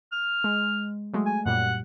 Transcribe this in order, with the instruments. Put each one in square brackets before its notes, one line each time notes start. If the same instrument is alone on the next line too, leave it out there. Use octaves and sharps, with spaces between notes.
[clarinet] F6
[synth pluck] G#3
F#3 G#3 A3
[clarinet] G#5
[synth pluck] F#2 A#2 G3 [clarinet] F#5